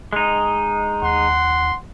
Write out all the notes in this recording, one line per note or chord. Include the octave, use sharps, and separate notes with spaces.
G#3 D#4
D#2 F#5 C6